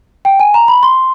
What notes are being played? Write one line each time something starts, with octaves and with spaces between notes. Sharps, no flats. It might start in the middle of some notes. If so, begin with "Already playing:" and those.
G5
G#5
A#5
B5
C6